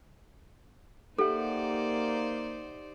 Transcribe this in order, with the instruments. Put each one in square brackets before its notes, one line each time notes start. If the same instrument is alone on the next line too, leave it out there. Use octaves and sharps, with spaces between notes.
[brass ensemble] A#3 [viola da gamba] D#4 C5 D5 [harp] G4 E5 F#5 [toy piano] A4